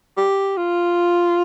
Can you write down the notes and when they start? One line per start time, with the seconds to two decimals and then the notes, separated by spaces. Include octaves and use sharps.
0.17 G4
0.57 F4